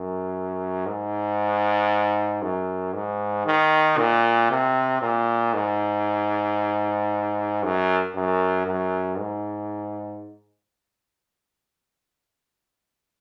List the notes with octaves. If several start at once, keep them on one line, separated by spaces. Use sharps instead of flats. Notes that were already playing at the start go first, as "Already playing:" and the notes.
Already playing: F#2
G#2
F#2
G#2
D#3
A#2
C3
A#2
G#2
F#2
F#2
F#2
G#2